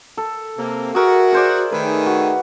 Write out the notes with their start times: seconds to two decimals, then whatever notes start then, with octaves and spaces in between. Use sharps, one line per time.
0.17 A4
0.58 C3 A#3
0.95 F#4 G#4 A#4 E5
1.32 G#4 C5 D5
1.72 D#3 A3 G#4 B4
2.06 F#4